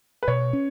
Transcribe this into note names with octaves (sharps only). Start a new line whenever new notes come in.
B4
B2 C#5
C#4